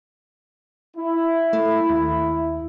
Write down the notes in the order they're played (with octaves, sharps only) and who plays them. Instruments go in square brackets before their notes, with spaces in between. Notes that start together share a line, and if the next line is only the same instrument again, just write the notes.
[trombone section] E4
[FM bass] A3
D#2